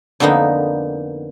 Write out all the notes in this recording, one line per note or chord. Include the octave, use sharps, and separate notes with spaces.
F2 D3 A#3 B3 D#4